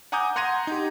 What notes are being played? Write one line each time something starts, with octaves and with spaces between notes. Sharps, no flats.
F#5 G#5 A#5 D6 D#6 G6
F#5 A#5 C6 G#6 A#6 D#7
D#4 G4